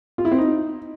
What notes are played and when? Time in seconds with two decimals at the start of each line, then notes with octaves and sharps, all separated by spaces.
0.18 F4
0.25 E4
0.32 C4
0.38 D#4